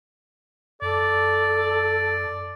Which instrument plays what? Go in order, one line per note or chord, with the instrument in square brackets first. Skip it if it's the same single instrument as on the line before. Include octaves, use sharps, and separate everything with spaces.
[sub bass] F#2 [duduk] A4 [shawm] D5